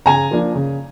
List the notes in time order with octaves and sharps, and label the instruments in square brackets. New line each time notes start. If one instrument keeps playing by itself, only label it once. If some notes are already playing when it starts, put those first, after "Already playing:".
[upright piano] C#3 G#5 A#5
F3 A#3 D4
C#3